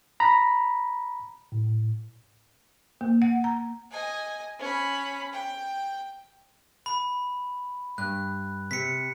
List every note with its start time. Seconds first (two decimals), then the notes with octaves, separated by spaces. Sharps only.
0.20 A#5 B5
1.52 A2
3.01 A#3
3.22 F#5
3.44 A#5
3.91 D#5 G#5
4.59 C#4 B5
5.33 G5
6.86 B5
7.98 G2 F#6
8.71 C3 B6 C#7